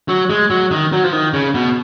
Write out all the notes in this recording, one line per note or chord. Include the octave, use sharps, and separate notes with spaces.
F#3
G#3
F#3
D#3
F#3
F3
D#3
C#3
B2